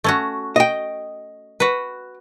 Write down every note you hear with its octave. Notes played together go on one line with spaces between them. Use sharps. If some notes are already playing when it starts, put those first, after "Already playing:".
A3 C#4 F#4
D#5 G5
F#4 B4